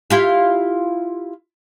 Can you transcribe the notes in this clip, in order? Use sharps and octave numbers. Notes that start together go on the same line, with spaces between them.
E4 F4 G4